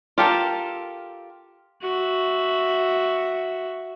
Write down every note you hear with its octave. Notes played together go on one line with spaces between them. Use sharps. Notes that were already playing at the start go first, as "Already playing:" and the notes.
F4 G4 A4 A#4
F#4 E5